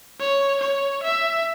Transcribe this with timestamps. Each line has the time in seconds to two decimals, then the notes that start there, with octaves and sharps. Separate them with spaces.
0.21 C#5
0.62 C#5
1.04 E5